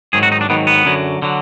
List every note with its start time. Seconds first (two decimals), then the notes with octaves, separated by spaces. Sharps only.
0.13 G#2 D#3 F#3 G#4
0.23 F#4
0.32 D#4
0.41 D4
0.49 G#2 D#3 F#3 B3
0.67 B3
0.85 F#2 D3 F#3
1.22 D3 F#3